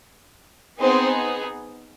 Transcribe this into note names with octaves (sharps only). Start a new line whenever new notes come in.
B3 C4 D#4 G#4 C5